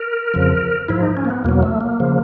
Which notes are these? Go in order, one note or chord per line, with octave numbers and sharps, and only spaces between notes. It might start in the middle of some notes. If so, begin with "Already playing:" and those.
Already playing: A#4
F2 C#3 F3
G#2 F3 E4
D#4
C#4
A#3
B3
E2 B2 F#3 A#3
A3
A#3
C#3 F3